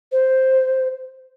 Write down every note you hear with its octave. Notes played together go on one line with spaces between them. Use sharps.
C5